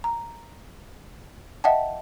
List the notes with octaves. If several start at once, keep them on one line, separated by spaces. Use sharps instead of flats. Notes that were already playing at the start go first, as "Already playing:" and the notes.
A#5
D#5 E5 F#5 G5 A5